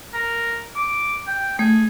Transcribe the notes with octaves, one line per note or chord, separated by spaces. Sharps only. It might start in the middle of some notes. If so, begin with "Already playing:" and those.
A#4
D6
G5
A3 G#4